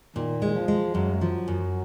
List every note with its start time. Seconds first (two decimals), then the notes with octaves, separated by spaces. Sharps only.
0.16 A#2 D#3
0.42 G#3
0.55 F3
0.68 G#3
0.95 F#2 F#3
1.21 F3
1.48 F#2